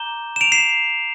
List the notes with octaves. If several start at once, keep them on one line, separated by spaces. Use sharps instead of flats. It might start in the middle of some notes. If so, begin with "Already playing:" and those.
Already playing: A#5 D6 G6 E7 G7
E7
D7 F7
C7 E7